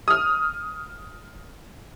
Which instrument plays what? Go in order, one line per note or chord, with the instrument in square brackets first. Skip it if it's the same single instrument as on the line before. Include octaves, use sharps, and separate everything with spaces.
[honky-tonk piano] D#6 F6